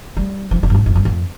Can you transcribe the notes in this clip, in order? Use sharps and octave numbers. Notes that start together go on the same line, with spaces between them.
G3
F3
D3
G2
G#2
F2
G2
F2